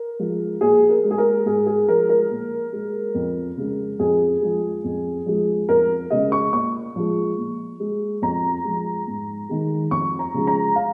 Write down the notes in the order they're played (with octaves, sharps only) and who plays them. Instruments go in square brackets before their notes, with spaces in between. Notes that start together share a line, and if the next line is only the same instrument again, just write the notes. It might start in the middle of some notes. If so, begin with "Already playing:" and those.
Already playing: [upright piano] A#4
F3 G#3
A#2 G#4
A#4
G#3
G#4
A#4
G#2 G#4
G#4
F3 G#3 A#4
A#4
A#2
G#3
F2
C#3 G#3
F2 G#4
F3 G#3
F2
F3 G#3
F2 A#4
C#3 G#3 D#5
C#6
A#2 C#6
F3 G#3
A#2
G#3
F2 A#5
F3 G#3
G#2
D#3 G#3
F2 C#6
A#5
C#3 F3 G#3
A#5
F5